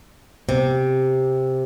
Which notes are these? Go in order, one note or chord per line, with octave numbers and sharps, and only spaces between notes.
C3